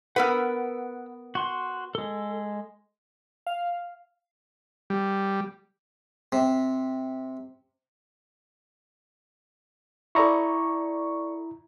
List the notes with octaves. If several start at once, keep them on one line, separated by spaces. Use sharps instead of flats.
B3 A#4 B4 F#5 E6
F#4 C6
G#3 A4
F5
G3
C3
E4 A4 D5 A#5 C#6